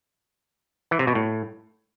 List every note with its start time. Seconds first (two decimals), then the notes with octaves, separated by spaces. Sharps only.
0.91 E3
0.99 C3
1.07 B2
1.15 A2